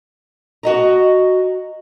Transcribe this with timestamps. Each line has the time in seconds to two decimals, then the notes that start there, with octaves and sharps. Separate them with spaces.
0.63 F#4 D#5 A#5